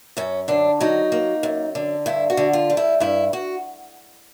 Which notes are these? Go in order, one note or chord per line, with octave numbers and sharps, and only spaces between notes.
F#2 C#4
D3 D4
F#3 D#4
A#3
F#2
D3
G2 E4
F#4
D3
F4
G3
E4
G2 E4
F#4